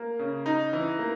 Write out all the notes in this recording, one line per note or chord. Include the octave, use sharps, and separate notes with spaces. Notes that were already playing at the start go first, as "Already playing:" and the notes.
Already playing: A#3
C#3
D#4
E3
A#3